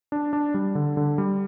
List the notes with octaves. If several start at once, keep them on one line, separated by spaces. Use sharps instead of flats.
D4
D4
G3
D3
D3
G3